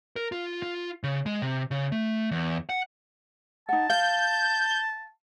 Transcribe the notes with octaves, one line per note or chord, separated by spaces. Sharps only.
A#4
F4
F4
C#3
G#3
C3
C#3
A3
E2
F#5
D#4 F#5 A5
F5 G6